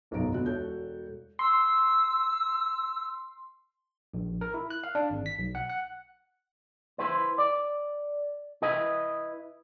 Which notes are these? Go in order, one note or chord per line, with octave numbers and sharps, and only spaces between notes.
F#1 B1 G#2 B2 A#5 D7
D2 B3 F#4 F#6
E1 F#4 A4 C#5 G6
C6 E6
A#1
A#4
E4
F#6
F5
D4
G#1
B6
B1
F#5
F#5
E4 B4 C5
D5
E4 B4 D#5